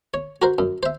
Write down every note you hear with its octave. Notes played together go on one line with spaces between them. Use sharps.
C#5
F#4 A#4 C5
F#2
C5 E5